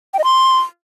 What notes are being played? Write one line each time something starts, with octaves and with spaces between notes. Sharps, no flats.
G5
D#5
C6